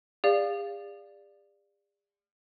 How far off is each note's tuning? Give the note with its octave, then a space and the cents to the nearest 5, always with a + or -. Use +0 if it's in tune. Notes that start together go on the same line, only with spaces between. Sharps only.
G#4 -45 D5 +0 F5 -5